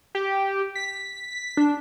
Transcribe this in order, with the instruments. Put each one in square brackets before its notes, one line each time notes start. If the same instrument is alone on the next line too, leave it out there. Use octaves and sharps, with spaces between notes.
[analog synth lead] G4
B6
[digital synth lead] D4